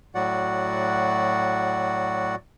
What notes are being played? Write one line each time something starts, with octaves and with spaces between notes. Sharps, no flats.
A2 F#3 F#4 D5 F#5